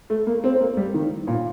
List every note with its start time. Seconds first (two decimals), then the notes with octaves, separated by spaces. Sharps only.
0.10 A3
0.27 A#3
0.44 C4
0.60 A#3
0.77 G3
0.94 D#3
1.27 A#2